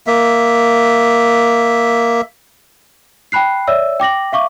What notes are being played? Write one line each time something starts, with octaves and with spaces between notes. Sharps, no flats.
A#3 E5
G5 A5 B5 F#6 C7
C#5 D5 E5 E6
G5 D6 A#6 F#7
E5 F5 C#6 D6